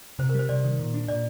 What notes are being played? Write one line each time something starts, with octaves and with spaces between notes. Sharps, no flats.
C3 C5
A#4
G3 C5
C3 D5
D#3
A#2
D4
A#2 D5